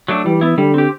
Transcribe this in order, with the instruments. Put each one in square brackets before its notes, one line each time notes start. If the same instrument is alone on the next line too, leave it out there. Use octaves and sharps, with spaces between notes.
[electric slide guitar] F#3 A3 D4
[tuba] E3 [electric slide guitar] G3
[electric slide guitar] B3 E4
[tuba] D3 [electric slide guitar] G3
[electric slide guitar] C4 G4